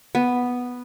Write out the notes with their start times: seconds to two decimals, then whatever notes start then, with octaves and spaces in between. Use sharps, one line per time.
0.15 B3